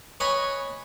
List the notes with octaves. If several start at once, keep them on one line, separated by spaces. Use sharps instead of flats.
B4 C#5 D#5 G#5